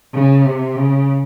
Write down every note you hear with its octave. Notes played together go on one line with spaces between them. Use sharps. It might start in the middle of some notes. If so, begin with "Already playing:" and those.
C#3
C3
C#3